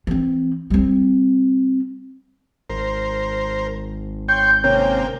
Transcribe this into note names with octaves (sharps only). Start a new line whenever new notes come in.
E3 C4
G3 C4
G#1 A#4 C5
C#5 G5 C6 G6
C3 A#3 C#4 G5